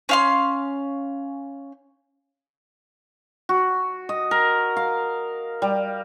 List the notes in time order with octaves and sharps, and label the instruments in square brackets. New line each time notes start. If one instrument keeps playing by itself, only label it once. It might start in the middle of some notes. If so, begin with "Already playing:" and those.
[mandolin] C#4 F5 C6
[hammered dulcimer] F#4
D#5
A#4
F5
G3